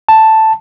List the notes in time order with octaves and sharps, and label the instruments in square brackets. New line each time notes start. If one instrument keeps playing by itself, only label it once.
[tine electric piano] A5